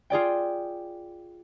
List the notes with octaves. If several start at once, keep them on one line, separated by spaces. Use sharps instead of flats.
F4 G#4 D5 G5